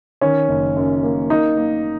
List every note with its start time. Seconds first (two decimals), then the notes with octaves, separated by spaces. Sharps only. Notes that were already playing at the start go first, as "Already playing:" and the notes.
0.21 D#3 C#4
0.49 F#1
0.76 F#2
1.03 A#3
1.30 A#3 D#4
1.57 A#3